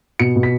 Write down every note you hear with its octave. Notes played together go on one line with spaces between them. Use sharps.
B2 C#7
B2
B6